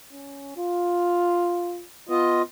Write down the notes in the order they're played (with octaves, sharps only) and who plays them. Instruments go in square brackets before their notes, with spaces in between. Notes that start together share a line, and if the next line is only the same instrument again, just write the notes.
[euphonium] C#4
F4
[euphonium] B3 [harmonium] F4 D#5